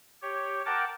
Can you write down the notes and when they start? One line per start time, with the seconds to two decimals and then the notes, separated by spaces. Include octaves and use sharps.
0.22 G4 C#5
0.66 A#4 F#5 G5 A5 D6